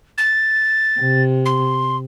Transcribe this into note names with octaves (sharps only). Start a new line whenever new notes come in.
A6
C3
C6